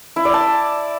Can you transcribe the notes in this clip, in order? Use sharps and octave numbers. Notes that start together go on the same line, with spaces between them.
E4
D5
A5